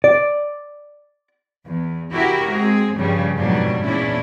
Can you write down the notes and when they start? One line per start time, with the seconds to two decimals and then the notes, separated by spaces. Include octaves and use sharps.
0.04 D5
1.65 E2
2.12 C#3 E4 F#4 G4 A#4
2.50 G#3 C4 G#4
2.96 G2 C#3 F3 G3
3.37 F2 G#2 B2 F#3 G3 D4
3.84 E2 A#2 C#4 D4 E4